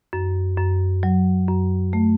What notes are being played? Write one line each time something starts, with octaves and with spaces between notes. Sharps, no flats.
F#2
F#2
F#3
F#2
A3